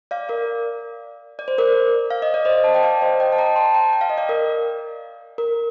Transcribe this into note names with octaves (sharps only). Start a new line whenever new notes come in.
D5 F5
A#4 D5
D5
C5
A#4 D5
F5
D#5
D5
C5 D#5
A5
G5
D5 F5
C5 D#5
D#5 G5
A5
G5 A#5
A5 C6
G5 A#5
G5
F5
D#5
D5 F5
A#4
A#4